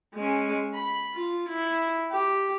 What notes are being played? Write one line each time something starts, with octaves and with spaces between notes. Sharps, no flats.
G#3 C#4
B5
F4
E4
G4